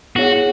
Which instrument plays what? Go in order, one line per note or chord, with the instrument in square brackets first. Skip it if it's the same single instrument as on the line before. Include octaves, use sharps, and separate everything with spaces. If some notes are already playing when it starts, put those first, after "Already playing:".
[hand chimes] B3 E4 G#4 C#5 F#5 [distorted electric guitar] F#4